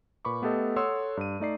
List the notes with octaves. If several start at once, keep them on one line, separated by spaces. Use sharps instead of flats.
A#2 B4 B5 C#6 D6
A3 B3 G4 A4 D#5
A4 C#5 F#5 C6 D#6 E6
G2 D#7
A3 D#4 D5 C7